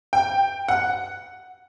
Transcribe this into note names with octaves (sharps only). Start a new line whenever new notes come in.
G5
F#5